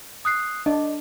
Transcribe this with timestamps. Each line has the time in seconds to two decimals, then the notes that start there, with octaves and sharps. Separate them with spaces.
0.25 D#6 F#6 C7
0.66 D4 D#5